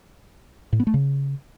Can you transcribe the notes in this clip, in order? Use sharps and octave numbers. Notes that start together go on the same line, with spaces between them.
A2
B3
A3
C#3